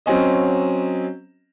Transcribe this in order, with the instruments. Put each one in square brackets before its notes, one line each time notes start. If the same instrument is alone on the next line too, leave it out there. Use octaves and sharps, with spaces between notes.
[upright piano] F#3 C4 C#4 D#5